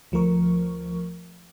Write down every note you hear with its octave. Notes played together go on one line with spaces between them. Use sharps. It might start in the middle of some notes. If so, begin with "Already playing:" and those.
D2 F3 A3 A#4 C#6